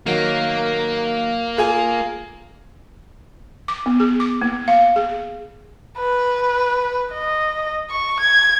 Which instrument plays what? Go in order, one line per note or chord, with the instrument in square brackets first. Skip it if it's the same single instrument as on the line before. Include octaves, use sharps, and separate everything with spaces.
[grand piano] D#3 F#3 [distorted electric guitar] A#3
[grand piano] F4 G#4 G#5
[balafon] D6
B3
G#4
D6
A#3
F5
G#4
[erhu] B4
D#5
C#6
G#6